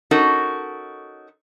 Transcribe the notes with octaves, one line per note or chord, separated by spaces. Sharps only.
C#4 D#4 F#4 A4 A#4